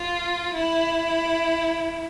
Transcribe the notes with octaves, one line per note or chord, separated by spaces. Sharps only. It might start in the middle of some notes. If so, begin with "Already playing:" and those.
Already playing: F4
E4